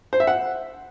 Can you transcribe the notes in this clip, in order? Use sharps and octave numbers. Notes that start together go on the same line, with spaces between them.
C5
E5
F#5